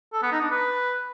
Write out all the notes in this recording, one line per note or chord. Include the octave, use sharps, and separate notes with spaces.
A4
B3
D#4
D4
B4